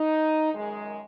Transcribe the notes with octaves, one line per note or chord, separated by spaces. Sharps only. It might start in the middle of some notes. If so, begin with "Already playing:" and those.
Already playing: D#4
F#2 D#3 G#3